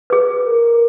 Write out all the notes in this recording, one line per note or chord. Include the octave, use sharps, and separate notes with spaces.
G#4 B4
A#4